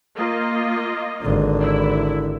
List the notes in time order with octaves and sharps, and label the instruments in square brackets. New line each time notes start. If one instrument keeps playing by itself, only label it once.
[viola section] A#3 F4 D#5
[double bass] G#1 D3
[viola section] E4